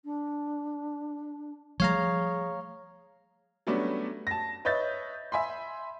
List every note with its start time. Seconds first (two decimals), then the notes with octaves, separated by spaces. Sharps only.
0.04 D4
1.80 F3 G3 A3 G#4 C#5 F5 A#5
3.67 F#3 G3 A3 B3 C#4 D4
4.27 A5 A#6
4.65 B4 C#5 D#5 E5 G6 A6
5.32 E5 G#5 B5 C6